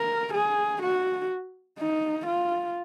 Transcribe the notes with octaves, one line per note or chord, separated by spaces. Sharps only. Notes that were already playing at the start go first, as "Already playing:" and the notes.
Already playing: A#4
G#4
F#4
D#4
F4